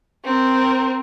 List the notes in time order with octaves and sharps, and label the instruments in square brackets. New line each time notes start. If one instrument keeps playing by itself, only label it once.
[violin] C4 A#4